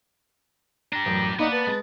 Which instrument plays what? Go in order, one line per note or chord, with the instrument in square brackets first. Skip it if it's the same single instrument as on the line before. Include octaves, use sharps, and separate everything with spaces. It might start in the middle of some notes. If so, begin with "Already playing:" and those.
[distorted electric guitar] D4 G4 [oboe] A#5
[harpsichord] A1 F#2
[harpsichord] A#3 D5 F#5 [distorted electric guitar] B3 [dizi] D#4
[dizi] B4 [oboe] A5
[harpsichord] G#3